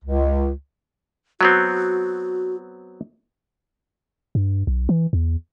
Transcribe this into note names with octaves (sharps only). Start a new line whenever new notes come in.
C#2
F#3 B3 C4 F#4
G2
B1
E3
E2